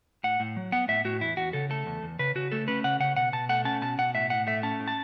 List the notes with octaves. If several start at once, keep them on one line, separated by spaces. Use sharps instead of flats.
A2 F#5
A2
F#3
B3 F#5
A2 E5
A2 F#4
E2 E4
E2 F#4
C#3 A4
A3 A4
E2
E2
C#3 B4
C#3 F#4
A3 A4
C#4 B4
C#3 F#5
C#3 F#5
B2 F#5
B2 A5
A3 F#5
C#4 A5
B2 A5
B2 F#5
A2 E5
A2 F#5
A3 E5
C#4 A5
A2
A5